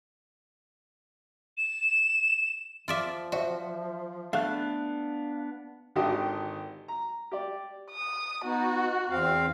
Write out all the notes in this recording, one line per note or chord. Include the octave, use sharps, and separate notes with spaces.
E7
F3 F4 D5 E5
F#4 C5 D5 E5
A3 B3 D4 F5 F#6
G#1 D3 D#3 G4 D#5 D#6
A#5
G4 D5
D#6
B3 D#4 F#4
E2 C4 F5